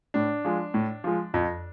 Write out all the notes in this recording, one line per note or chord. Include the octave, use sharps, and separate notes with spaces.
A2 D4
F3 G#3
A2
F3 G#3
F2